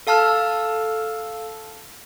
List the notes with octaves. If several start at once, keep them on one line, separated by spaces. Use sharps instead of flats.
A4 F5 A5 E6 F6